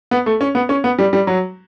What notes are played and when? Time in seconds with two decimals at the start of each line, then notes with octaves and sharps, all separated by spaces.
0.11 B3
0.26 A3
0.41 C#4
0.55 B3
0.69 C#4
0.84 B3
0.99 G3
1.13 G3
1.27 F#3